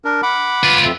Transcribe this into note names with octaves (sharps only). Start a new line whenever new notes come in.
D4 A#4
F#5 B5 D6
F4 B4
F2 E5